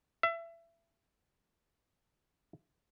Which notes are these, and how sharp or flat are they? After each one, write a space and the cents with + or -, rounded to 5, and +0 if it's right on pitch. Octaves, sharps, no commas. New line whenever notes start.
E5 +25